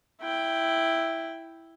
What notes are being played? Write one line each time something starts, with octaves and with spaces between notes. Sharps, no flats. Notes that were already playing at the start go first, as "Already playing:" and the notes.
E4 G5